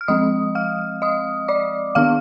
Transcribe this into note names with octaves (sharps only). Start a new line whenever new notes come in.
F6
F3 G#3 C4 D#5 D#6
F5 F6
D#5 D#6
D5 D6
D#3 B3 D4 F5 F6